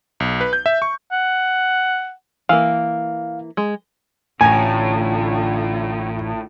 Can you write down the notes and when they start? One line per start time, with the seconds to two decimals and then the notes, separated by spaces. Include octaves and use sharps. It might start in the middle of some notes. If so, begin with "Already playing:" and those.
0.20 B1
0.41 B4
0.53 G6
0.66 E5
0.82 C#6
1.12 F#5
2.49 E3 A#3 F5
3.57 G#3
4.41 A1 A2 D3 F4 G#5 A#5